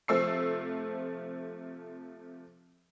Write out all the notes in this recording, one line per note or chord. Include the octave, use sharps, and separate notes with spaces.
C3 F3 A3 E6 C7